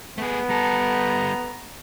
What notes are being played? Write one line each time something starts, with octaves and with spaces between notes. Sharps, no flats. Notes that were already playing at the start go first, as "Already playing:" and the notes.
A3 B3 G#4
G3 A4 A#5